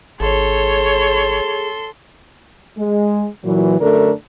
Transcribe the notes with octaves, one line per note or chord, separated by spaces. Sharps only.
G#1 G#4 A4 C#5 C6
G#3
A#2 E3 F#3
F#2 D3 A3 D4 A4 A#4